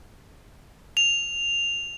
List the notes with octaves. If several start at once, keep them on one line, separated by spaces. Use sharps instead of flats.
F7